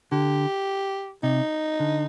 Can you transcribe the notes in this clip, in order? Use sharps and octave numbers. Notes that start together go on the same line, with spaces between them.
D3 G4
C3 D#4
D3